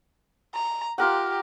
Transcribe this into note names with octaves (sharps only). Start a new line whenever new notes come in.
A#5
F4 G4 A#4 F#5